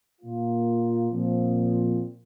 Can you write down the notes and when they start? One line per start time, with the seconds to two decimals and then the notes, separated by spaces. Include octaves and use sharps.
0.21 A#2 A#3 F4
1.11 A#2 F3 C4